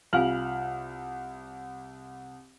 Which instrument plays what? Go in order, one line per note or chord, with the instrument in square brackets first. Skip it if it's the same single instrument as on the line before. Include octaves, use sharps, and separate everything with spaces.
[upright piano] C2 F6 F#7 [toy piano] F4 F5 G#5